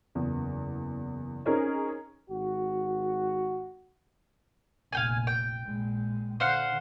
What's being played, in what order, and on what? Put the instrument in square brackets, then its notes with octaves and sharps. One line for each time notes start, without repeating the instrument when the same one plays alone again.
[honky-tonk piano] F#1 E2
C4 C#4 D#4 G#4 A#4
[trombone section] G#1 F#4
[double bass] F1 A#1 [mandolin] F5 G5 G#5
[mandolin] G5
[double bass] A#1 G#3
[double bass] D3 [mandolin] C5 F5 F#5